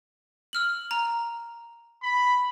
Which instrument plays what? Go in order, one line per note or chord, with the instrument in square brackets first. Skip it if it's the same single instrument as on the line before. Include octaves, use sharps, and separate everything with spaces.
[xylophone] E6 F6 F#7
A#5
[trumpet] B5